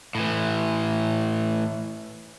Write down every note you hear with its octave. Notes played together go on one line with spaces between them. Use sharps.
A2 E3